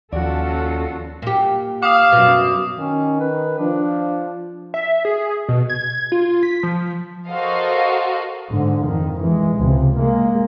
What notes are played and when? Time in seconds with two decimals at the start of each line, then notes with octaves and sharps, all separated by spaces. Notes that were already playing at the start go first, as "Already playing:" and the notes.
0.12 D#2 F3 C#4 F4 F#4 A4 D5
1.22 A#2 G4
1.83 F5 D6 D#6
2.12 F#2 B2
2.77 D#3 C#4
3.20 B4
3.58 F3 D4
4.74 E5
5.05 G#4
5.49 B2
5.69 G#6
6.12 F4
6.43 B6
6.63 F3
7.28 F#4 A4 A#4 C5 D#5 F5
8.50 G#2 D3
8.85 F2 D#3
9.21 E3 G#3
9.56 C#2 C3
9.98 G#3 A#3